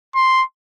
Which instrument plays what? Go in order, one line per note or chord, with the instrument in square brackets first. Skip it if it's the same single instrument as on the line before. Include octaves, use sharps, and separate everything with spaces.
[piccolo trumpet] C6